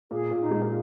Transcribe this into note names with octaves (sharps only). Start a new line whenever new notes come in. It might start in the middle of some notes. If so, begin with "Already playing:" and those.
A#2 G#4
A#2
D#4
G#3
A#3